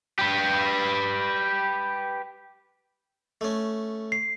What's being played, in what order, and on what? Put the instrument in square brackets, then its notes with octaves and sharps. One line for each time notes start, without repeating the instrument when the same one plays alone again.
[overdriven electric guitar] G4 B4
[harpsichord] A3 C#4
[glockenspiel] C7